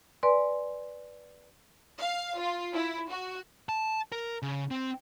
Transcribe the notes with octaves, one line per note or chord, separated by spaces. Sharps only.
B4 D5 G#5 C6
F5
F4
E4
F#4
A5
A#4
C#3
C4